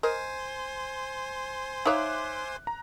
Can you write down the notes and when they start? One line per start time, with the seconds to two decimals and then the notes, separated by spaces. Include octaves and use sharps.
0.03 A#4 C5 D#5 G#5 C6
1.85 D#4 C#5 E5 F5 D6 F#6
2.67 A#5